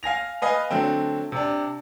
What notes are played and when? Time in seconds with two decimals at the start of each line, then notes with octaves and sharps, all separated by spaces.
0.03 F5 G#5 A#6 F7
0.42 B4 D#5 F5 G#5
0.70 D3 F#3 A3 C4
1.32 C3 D4